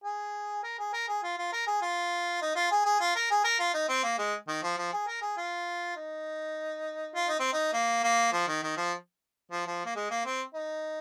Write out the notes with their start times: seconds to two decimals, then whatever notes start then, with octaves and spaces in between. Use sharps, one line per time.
0.04 G#4
0.64 A#4
0.79 G#4
0.93 A#4
1.09 G#4
1.23 F4
1.38 F4
1.53 A#4
1.67 G#4
1.82 F4
2.42 D#4
2.56 F4
2.71 G#4
2.85 G#4
3.01 F4
3.16 A#4
3.31 G#4
3.45 A#4
3.60 F4
3.74 D#4
3.89 C4
4.04 A#3
4.19 G#3
4.48 D#3
4.63 F3
4.78 F3
4.93 G#4
5.07 A#4
5.22 G#4
5.37 F4
5.96 D#4
7.15 F4
7.27 D#4
7.40 C4
7.53 D#4
7.74 A#3
8.04 A#3
8.33 F3
8.48 D#3
8.63 D#3
8.77 F3
9.51 F3
9.67 F3
9.86 A#3
9.96 G#3
10.11 A#3
10.26 C4
10.55 D#4